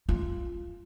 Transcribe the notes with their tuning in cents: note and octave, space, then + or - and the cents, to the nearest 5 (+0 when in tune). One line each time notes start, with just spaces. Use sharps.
F4 -10